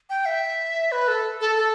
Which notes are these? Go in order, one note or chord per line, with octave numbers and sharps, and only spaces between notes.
G5
E5
B4
A4
A4
A4